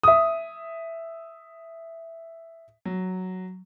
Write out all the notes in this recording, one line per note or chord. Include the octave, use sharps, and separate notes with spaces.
E5 D#6
F#3